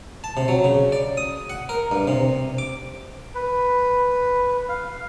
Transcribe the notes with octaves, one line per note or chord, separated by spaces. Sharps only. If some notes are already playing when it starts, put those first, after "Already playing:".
A5
C3
F#3
C#3
D5
D#6
F#5
A#4
G2
C3
D6
B4
F5